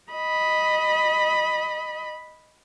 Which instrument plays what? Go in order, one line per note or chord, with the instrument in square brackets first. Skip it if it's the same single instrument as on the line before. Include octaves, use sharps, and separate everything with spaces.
[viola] D#5 B5